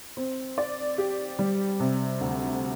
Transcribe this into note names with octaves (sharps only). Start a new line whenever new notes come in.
C4
D5
G4
G3
C3
D2